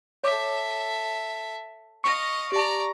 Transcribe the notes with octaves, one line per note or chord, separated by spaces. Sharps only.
A4 C#5 E5 D6
D#5 F5 C#6 A#6
G4 D5 A5 A#5